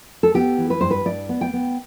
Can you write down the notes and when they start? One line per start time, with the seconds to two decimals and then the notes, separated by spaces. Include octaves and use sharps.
0.23 A4
0.34 B3 G4
0.58 E3
0.70 B4
0.81 G2 C5
0.91 B4
1.05 G2 D5
1.29 B3
1.41 G5
1.53 B3